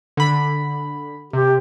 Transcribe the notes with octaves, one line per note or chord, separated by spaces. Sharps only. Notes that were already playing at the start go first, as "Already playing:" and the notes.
D3 B5
C3 G4